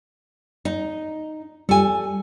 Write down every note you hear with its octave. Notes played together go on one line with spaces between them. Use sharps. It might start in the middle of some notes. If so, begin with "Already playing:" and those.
D#4
G3 A4 G#5